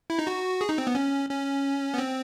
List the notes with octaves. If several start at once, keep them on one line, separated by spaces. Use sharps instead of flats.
E4
D#4
F#4
G#4
D#4
C4
B3
C#4
C#4
B3
C4